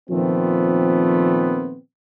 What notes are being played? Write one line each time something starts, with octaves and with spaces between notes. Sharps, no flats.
A#2 D#3 F3 A3 B3 C4